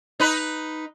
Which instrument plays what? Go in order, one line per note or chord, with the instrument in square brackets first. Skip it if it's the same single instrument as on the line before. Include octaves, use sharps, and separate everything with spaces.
[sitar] D#4 B4